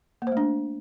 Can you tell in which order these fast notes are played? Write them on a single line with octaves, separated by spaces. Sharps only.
A#3 C5 A3 D4